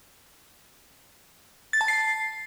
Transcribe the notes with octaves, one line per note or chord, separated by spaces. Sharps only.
A6
A5
C7